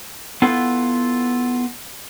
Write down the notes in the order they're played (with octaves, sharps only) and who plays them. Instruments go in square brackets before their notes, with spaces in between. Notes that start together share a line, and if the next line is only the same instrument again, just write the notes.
[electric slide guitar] B3 E4 F4 A4 B4